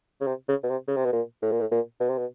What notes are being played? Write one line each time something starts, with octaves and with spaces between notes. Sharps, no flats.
C#3
C3
C#3
B2
C3
C#3
C3
B2
A#2
A2
A#2
A2
A#2
B2
C3
B2